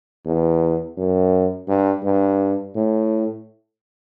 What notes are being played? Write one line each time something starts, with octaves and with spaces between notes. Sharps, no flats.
E2
F#2
G2
G2
A2